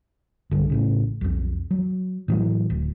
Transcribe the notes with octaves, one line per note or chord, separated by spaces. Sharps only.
B1 G2 D3
A1 A2 C#3
B1 F2
F#3
A2 E3 F#3
D1